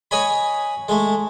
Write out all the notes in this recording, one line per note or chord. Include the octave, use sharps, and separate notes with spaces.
B4 C#5 D#5 G#5 B5
G#3 A3